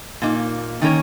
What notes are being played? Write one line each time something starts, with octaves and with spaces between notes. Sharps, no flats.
A#2 A#3 D#4
D#3 A#3 C#4 A#4 C#5